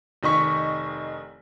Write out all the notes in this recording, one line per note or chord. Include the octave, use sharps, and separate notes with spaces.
F1 D#3 D#5 C#6 B6